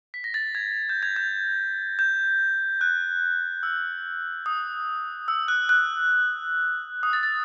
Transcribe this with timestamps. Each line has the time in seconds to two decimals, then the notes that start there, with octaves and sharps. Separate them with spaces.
0.14 B6
0.24 A#6
0.34 A6
0.55 G#6
0.89 G6
1.03 G#6
1.16 G6
1.99 G6
2.81 F#6
3.63 E6
4.46 D#6
5.28 E6
5.48 F#6
5.69 F#6
7.03 D#6
7.13 A6
7.23 A6